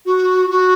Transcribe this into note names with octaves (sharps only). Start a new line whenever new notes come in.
F#4
F#4